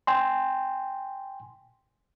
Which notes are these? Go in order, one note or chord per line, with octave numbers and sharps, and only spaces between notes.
G5 G#5 C6